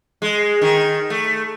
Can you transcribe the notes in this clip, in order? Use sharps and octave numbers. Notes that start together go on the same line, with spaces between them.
G#3
D#3
A3